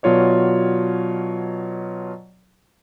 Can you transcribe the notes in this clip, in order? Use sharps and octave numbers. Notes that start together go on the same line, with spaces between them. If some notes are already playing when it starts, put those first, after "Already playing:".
B2 F#3 F4 C#5 D5